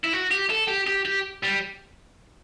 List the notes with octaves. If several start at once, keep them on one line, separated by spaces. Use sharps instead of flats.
E4
F#4
G4
A4
G4
G4
G4
G3